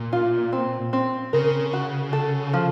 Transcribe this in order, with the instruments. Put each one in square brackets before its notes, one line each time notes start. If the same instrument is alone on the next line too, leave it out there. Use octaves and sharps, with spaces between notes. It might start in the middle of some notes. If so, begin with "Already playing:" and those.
Already playing: [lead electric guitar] A#2
[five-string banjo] F4
C4
C4
[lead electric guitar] C#3 [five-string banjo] A#4
[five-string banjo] F#4
A4
F3